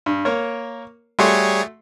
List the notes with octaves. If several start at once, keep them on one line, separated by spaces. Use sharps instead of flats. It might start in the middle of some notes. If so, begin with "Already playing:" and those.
G2
A#3 A#4 C#5
G3 A3 F#4 G#4 C#5 C6